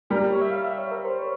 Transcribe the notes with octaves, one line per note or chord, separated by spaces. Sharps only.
G3 A#4
C#5
E5
F5
E5
C#5
A#4
C5
C#5